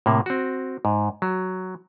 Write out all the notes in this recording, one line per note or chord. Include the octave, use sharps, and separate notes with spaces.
A2 C3 A#3
C4 F#4
G#2
F#3